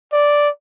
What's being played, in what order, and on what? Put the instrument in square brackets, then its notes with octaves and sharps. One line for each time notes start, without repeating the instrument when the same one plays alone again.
[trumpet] D5